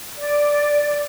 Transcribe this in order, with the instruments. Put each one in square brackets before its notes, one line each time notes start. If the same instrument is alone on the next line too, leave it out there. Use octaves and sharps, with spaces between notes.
[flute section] D5